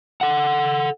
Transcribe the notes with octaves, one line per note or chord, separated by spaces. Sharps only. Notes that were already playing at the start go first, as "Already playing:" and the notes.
A4 F#5